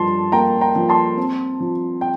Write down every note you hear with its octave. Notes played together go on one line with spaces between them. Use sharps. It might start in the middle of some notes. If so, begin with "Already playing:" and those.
Already playing: G2 F3 A5 C6
A#3 G5 A#5
G5 A#5
F3
A5 C6
C4
F3
G5